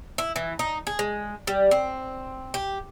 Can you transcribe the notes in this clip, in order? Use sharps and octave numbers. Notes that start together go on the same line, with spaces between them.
E4
E3
D#4
G#4
G#3
G3
C4
G4